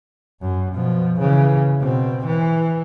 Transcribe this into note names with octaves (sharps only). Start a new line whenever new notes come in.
F#2
B2 F3
C#3 E3
B2 C4
E3